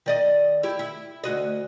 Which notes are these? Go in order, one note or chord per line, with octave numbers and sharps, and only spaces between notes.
D#3 D5 D#5
E4 G4
E4
D2 F#4 D#5